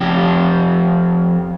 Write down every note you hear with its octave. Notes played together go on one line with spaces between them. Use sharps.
F2 G4